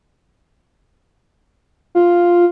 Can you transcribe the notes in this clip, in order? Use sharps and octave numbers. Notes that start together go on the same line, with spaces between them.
F4